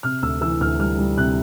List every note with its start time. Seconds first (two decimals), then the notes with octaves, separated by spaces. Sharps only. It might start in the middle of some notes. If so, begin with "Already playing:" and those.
0.03 C3 F6
0.22 D2 E6
0.41 E3 E6
0.61 D2 F6
0.79 G3 F6
0.98 G3
1.18 C3 F#6